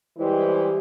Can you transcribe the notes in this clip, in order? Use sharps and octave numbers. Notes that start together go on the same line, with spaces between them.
E3 G3 G#3 E4 G4 C5